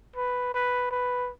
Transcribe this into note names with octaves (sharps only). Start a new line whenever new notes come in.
B4
B4
B4